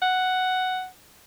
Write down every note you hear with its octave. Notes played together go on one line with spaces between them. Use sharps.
F#5